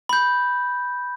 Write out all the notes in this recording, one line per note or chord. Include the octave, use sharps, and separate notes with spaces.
B5 G6